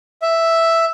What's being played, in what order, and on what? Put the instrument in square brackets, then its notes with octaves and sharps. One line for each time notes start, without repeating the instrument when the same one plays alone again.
[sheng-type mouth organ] E5